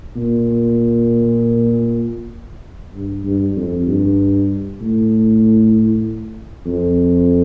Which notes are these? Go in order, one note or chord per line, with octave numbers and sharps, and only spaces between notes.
A#2
G2
G2
F2
G2
A2
F2